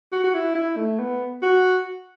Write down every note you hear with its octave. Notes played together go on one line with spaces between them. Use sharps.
F#4
F#4
E4
E4
A3
B3
F#4